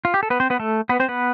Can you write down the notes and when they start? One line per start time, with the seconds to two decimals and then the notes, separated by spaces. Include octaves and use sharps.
0.05 F4
0.14 G4
0.23 A4
0.30 B3 B4
0.40 C4 C5
0.50 B3 B4
0.60 A3 A4
0.89 B3 B4
1.00 C4 C5
1.09 B3 B4